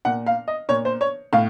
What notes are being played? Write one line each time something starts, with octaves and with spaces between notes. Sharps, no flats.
A#2 F#5
F5
D#5
A#2 C#5
C5
C#5
A2 F5